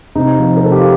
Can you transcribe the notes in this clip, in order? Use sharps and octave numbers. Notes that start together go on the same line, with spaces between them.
C3 D#4
F3
A#4
C3 A4
G4
F4